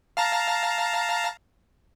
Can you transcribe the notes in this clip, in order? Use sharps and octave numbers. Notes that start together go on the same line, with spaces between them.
F5 A5 A#5